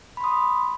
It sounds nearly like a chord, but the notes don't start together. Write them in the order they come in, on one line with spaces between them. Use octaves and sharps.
B5 C6 D#6